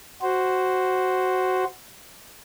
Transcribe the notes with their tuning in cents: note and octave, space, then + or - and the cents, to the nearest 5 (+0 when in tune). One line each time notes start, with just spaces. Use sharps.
F#4 +5 C5 +0